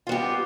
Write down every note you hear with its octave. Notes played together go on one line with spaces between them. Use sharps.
B3 F4 G4